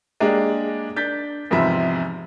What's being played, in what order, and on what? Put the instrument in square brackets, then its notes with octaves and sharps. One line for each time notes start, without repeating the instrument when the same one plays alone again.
[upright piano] G#3 A#3 D4 G4
D4 G6 A6 B6
E2 G#2 C3 F3 E5 B5